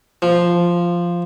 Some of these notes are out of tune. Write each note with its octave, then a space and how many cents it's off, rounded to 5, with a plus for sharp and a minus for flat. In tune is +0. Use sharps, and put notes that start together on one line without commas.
F3 -5